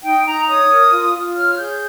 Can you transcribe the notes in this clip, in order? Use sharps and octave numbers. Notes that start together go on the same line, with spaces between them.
D#4 G5
D#4 A#5
C#5 D#6
A#4
F4
F4
C#5 F6
G#4 G6